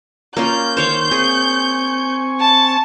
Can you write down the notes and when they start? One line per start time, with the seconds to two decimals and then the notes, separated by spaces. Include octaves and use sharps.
0.37 A#3 C#4 F4 G6
0.77 D#3 C5 C#5 F5 C6
1.11 C4 G#4 G#5 C#6
2.40 A5